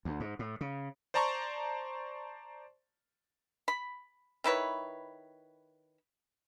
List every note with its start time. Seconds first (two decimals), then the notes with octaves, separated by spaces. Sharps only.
0.05 D2
0.20 G#2
0.39 A2
0.61 C#3
1.14 C5 D5 A5 A#5 C6 C#6
3.68 B5
4.44 D#3 E4 B4 C#5